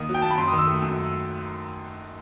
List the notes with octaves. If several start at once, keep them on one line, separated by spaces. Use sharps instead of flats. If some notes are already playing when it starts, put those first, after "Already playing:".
Already playing: D#2 D#3 D#6
F#3
G5
D#2 A5
B5
F#2 C6
D#3 D#6
E6
A3
F#2